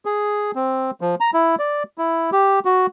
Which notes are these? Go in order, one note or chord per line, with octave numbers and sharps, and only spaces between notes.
G#4
C4
F3
A#5
E4
D5
E4
G4
F#4